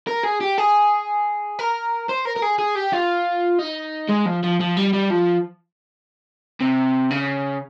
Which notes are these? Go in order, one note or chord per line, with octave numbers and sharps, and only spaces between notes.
A#4
G#4
G4
G#4
A#4
C5
A#4
A#4
G#4
G#4
G4
F4
D#4
G#3
F3
F3
F3
G3
G3
F3
C3
C#3